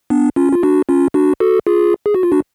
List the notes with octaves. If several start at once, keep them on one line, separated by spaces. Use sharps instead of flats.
B3 D4
C#4 F4
F4
D4 F#4
C#4 F4
D4 F#4
F#4 A4
F4 G#4
G#4
F#4
F4
D4 F#4